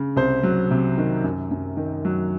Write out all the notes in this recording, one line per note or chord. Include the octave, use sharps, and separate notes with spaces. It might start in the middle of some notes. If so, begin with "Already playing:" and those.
Already playing: C#3
C2 C5
F#3
C3
D#3
F#2
F#2
D#3
F#3